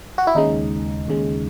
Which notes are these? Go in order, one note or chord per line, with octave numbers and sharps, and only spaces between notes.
F#4
E4
D#2 C#3 G#3 D#4
D#2 C#3 G#3